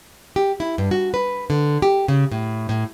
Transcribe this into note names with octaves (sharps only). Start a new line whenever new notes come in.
G4
E4
G2
F#4
B4
D3
G4
C#3
A2
A2